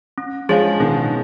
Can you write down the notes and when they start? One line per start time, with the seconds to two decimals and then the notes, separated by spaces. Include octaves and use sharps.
0.18 C#4
0.49 F3 G#3 G#4 C#5 F5
0.80 B2 D#3 C#4